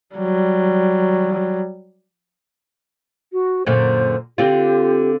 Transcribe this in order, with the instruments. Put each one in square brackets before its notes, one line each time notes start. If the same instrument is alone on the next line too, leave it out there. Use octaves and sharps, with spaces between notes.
[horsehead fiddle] F#3 G3
[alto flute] F#4
[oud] F#2 A#2 D3 [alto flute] C5
[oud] D3 C4 F4 [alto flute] G4